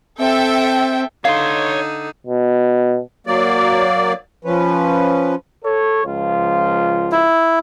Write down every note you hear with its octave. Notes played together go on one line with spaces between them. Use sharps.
C4 A4 E5 G5
D3 D#4 C#5 F5 C6
B2
F#3 A#3 D5
F3 C#4 B4
A4 C#5
C#2 F3 F4
E4